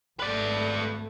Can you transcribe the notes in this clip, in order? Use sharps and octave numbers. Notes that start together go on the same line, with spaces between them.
G#1 A3 B4 D5